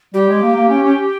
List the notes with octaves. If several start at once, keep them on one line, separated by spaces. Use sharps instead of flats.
G3 G4
G#3
A#3
A#3
C#4
C#4